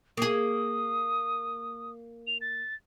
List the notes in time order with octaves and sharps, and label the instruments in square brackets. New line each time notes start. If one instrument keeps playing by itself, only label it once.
[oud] A#3 G#4 [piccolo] D#6
[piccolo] F7
A6